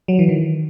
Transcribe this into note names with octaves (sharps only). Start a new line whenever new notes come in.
F#3
E3
D#3